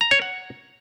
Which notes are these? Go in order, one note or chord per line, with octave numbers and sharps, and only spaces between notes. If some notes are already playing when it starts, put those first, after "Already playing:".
A#5
C#5
F#5